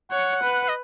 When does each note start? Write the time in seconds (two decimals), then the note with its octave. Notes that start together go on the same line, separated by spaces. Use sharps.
0.11 C#5 F#5
0.43 B4
0.69 D#5